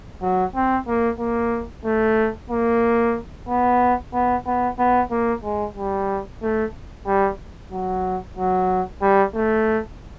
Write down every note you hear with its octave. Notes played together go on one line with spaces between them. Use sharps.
F#3
C4
A#3
A#3
A3
A#3
B3
B3
B3
B3
A#3
G#3
G3
A3
G3
F#3
F#3
G3
A3